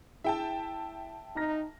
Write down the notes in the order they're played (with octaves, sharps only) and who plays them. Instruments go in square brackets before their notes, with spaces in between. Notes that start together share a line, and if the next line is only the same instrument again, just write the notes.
[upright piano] E4 G#4 [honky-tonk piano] E5 G5 A5
[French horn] D#4 [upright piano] A#5 F6 A#6